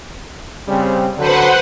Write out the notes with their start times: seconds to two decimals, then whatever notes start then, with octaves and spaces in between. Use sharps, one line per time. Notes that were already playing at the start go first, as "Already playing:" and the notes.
0.68 C#3 G3 C4
1.18 D3 F#3 B4 C5 F#5